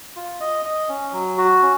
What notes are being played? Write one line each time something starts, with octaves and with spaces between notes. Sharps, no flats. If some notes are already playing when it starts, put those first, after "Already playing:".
F4
D#5
D#5
C#4
F#3
F#4
C#4